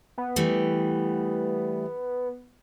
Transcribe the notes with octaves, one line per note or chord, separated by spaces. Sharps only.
B3
E3 G3 A3